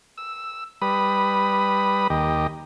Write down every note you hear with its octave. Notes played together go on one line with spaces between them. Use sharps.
E6
G3 B4 B5 D#6
D#2 G4 D#5